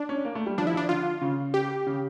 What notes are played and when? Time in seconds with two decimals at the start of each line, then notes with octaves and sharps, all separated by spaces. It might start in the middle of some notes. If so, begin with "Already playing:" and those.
Already playing: D4
0.09 C#4
0.25 A#3
0.35 A3
0.46 G3
0.58 F3 D4
0.67 E4
0.74 F3 D4
0.89 D3 F4
1.22 C#3
1.54 G4
1.87 C#3